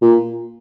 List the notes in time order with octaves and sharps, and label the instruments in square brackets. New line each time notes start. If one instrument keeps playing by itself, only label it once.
[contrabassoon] A#2